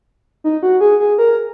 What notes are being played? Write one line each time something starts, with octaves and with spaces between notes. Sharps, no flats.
D#4
F#4
G#4
G#4
A#4